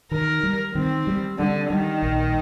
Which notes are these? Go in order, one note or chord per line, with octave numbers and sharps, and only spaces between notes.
D#3 A#4
G3
D#3 C4
G3
D3 G3
D#3 G3
A#1